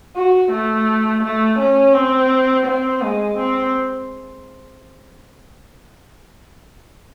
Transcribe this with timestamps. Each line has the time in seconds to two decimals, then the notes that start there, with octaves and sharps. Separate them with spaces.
0.16 F#4
0.52 A3
1.23 A3
1.59 C#4
1.94 C4
2.66 C4
3.02 G#3
3.38 C4